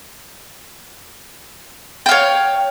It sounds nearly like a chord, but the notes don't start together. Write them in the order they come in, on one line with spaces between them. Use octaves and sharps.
G5 F5 C#5